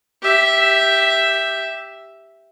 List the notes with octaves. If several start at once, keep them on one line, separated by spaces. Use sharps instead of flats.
G4 E5